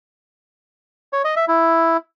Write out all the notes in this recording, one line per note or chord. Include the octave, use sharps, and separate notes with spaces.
C#5
D#5
E5
E4